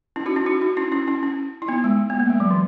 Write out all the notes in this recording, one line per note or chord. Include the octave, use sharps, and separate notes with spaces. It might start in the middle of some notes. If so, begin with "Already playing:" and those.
C#4 E4
D#4 F#4
C#4 E4
D#4 F#4
D#4 F#4
C#4 E4
C#4 E4
C#4 E4
C#4
E4
B3 D#4
G#3
B3
A#3
G#3
F#3
E3